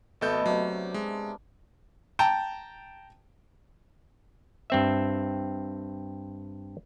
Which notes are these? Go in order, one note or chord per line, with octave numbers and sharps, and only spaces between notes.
G#1 B2 A3 A4 B4 G6
C3 F#3 D4 A#4
G#3
G5 A5 A#5
G2 C4 E5